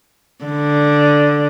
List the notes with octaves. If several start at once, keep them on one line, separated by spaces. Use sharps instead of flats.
D3